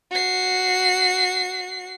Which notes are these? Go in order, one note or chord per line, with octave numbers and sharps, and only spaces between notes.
F#4 C7